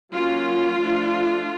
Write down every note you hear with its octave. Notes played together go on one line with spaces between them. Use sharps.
F#3 A#3 C#4 F4
F3 A3 D4